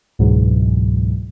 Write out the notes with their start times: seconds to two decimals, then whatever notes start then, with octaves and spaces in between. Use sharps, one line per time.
0.19 C#2 G#2 B2 E3 F#3 G#3